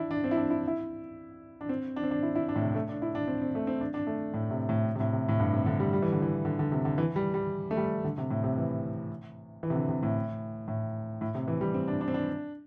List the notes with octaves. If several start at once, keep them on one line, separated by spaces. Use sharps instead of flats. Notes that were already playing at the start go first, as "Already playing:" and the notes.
Already playing: D4 E4
D4
C4
E4
D4
E4
E4
D4
C4
D4
C4
D4
E4
E4
D4
A2
C3
A3
D4
E4
D4
C4
C4
A3
C4
D4
D4
A3
A2
C3
A2
C3
A2
C3
A2
G2
C3
D3
G3
G3
E3
D3
E3
D3
D3
C3
D3
E3
G3
G3
A3
G3
D3
C3
A2
C3
E3
E3
C3
D3
C3
A2
A2
A2
C3
E3
G3
C4
D4
D4
C4
D4